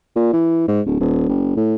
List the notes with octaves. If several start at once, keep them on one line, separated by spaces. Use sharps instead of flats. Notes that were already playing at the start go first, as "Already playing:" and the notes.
A#2
E3
G#2
D1
D#1
F#1
A2